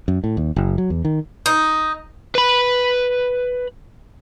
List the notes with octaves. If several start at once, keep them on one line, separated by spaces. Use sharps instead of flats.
F#2
A2
D#2
F#1
F#3
E2
D#3
D#4
B4 B5